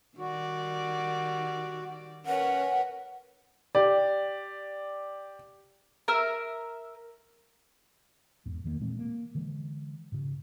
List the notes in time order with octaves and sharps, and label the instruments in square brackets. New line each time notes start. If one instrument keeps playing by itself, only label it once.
[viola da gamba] D#3 G3 D5 [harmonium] F#4
[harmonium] C#4 [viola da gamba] A#4 B4 C#5 [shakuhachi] F#5
[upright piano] G4 D5
[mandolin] A#4 E5 F6
[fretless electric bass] E2 G#2
E2 D#3 A3 A#3
A#2 E3 G#3 C4
A#3
D3 E3 G#3
G#2 C#3